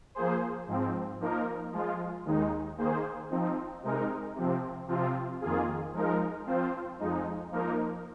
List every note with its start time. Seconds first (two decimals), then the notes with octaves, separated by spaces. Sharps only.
0.15 F3 A#3 G#4 C5
0.67 G#2 F3 C4
1.20 F3 A#3 D#4 A#4
1.72 F3 G#3 F4
2.25 D#2 D#3 G#3 D#4
2.78 D#3 A#3 G#4 C5
3.30 F3 C4 D#4
3.83 C3 G#3 D#4 A#4
4.36 C3 F3 C4
4.88 C3 F3 C4 F4
5.41 F2 D#3 A#3 F4 G#4
5.93 F3 G#3 D#4 A#4
6.46 F3 C4 F4 C5
6.99 F2 F3 G#3 D#4
7.52 F3 A#3 D#4 A#4